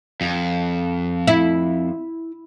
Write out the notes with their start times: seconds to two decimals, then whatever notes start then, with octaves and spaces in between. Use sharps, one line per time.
0.21 F2
1.27 E4